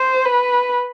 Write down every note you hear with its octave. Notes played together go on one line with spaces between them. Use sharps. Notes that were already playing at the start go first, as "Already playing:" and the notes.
Already playing: C5
B4